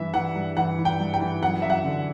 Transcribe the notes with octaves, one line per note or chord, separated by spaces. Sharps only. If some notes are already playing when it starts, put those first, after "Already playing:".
Already playing: G2 E3 E5
E3 F#5
G2
E3 F#5
E3
G5
G2
G5
E3
F#2 F#5
F#2 E5
F#5
D3